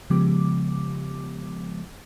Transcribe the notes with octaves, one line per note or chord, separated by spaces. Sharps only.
C#3 F3 G#3 B3 G4 D6